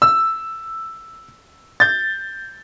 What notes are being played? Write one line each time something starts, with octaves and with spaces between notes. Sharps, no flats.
E6
G6 A6